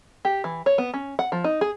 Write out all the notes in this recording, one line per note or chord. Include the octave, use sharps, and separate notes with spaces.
G4
E3
C#5
B3
C#4
F#5
F3
D#4
G#4